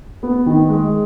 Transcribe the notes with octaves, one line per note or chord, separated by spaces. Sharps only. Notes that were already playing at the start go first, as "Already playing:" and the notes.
B3
D#3
G#3